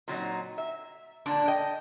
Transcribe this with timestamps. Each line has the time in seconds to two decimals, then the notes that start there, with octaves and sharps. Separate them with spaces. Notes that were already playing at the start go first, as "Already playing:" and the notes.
0.08 A#2 F#3 C4 D#4
0.58 E5
1.26 A#2 D3 D4 D5
1.48 D#5 G5